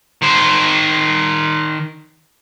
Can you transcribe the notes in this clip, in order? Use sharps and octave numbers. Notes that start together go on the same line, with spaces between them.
D#3 C5